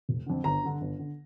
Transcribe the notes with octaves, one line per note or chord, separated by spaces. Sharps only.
F1
F2 D3
G1 A#5
G2 D3
G1
D3